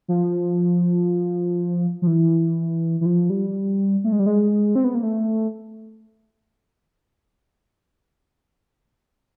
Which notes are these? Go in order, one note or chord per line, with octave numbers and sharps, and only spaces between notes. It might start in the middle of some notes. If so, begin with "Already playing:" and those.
F3
F3
E3
E3
F3
G3
A3
G#3
G3
G#3
C4
B3
A#3
A3